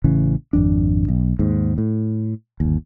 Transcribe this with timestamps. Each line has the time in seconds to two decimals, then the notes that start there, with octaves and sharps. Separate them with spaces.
0.04 A1 C#3 E3
0.53 G#1 F2 D4
1.08 B1
1.39 D#2 G#2
1.78 A2
2.60 G1 D#2